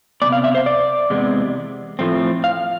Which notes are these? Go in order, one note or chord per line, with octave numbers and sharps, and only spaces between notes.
C3 E3 B3 D5
F5
E5
C5
D5
E2 C3 G#3 B3
A2 F3 A3 C4
F5